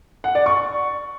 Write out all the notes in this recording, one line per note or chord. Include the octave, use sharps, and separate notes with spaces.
F#5
D5
C#6